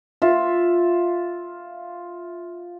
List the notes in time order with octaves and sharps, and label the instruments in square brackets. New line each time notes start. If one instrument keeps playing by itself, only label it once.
[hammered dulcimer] F4 E5